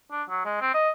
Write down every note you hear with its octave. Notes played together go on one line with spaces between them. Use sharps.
D4
F#3
G#3
C4
D#5